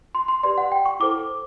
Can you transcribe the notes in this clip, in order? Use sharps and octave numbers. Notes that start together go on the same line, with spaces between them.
C6
C6
G4 B4 D5 C6
F#5
G5
C#6
E4 A4 C5 D6